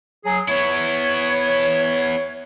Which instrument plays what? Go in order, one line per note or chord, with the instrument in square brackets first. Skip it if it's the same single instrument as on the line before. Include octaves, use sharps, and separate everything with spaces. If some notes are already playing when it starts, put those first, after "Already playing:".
[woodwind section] F#3 G#4
[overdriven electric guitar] B3 E4 [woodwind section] C#5